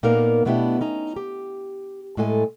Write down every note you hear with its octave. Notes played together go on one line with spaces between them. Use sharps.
A#2 A#3 B3 D#4 A#4 F5
B2 A3 B3 D4 E4 G4
C#4 D#4 A#5
G4
A2 G#3 A4 G#5